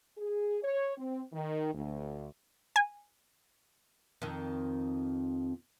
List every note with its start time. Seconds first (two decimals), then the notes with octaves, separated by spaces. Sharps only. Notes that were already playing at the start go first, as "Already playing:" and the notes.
0.17 G#4
0.63 C#5
0.98 C4
1.33 D#3
1.73 D2
2.76 G#5
4.22 F2 D#3